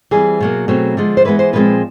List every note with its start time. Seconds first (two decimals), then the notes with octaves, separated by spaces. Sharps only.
0.11 E3 G3 C4 G#4
0.40 B2 F#3 A#3
0.68 B2 F#3 A3 C4
0.97 D3 F3 G#3
1.17 C5
1.25 E3 G#3 B3 B4
1.39 C5
1.53 A#2 F3 G#3 C4 B4